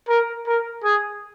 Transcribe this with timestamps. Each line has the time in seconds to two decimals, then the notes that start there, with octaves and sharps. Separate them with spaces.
0.09 A#4
0.47 A#4
0.84 G#4